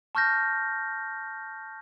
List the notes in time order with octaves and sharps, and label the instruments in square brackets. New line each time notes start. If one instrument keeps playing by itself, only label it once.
[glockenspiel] A5 C#6 F6 G6 A#6